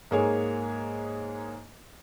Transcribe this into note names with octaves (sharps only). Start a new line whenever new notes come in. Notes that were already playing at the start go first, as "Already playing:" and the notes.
G#2 G#3 A#3 G#4 C#5